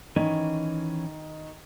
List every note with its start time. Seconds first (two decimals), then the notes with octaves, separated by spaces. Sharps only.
0.16 D#3 E3 C#4